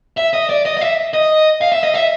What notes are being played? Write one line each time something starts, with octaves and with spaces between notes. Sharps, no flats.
E5
D#5
D5
D#5
D#5
E5
D#5
F5
E5
D#5
E5